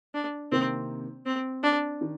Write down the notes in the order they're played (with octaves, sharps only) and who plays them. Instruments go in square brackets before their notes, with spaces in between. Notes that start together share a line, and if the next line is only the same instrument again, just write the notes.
[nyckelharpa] D4
[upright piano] C3 D#3 A#3 [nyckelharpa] C4
[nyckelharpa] C4
D4
[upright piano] D#3